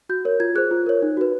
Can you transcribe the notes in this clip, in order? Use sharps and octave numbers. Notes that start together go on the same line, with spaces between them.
F#4 G6
A#4 C#5
F4 G#6
G#4 C5 F#6
F4
A#4 C#5
D#4
F#4 B4